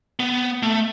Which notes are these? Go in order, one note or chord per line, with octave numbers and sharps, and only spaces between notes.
B3
A3